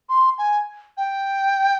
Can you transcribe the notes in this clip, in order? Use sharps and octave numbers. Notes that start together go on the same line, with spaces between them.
C6
G#5
G5